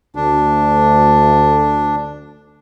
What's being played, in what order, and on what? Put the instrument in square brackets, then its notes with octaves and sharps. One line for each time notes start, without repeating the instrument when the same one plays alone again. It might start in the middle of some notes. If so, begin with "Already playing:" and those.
[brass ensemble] D2 [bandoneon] D4